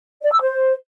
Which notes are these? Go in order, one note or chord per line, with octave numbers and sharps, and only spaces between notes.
D5
E6
C5